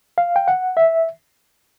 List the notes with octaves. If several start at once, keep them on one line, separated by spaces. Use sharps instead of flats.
F5
G5
F#5
E5